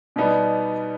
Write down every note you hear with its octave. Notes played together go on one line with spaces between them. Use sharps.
B2 G3 B3 D#4